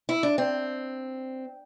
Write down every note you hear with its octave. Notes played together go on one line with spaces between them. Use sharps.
E4
D4
C4